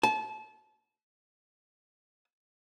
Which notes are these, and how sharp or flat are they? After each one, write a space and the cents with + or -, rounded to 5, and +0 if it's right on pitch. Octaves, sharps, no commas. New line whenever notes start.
A5 -30